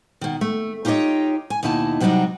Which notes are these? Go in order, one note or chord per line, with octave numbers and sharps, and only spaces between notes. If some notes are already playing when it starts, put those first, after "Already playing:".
B2 D#3
A3
D#4 F4 G4 G#4 C#5 D#5
G#5
D#2 B2 D#4 E4 A5
C3 F#3 G3 D4 D#4 F#4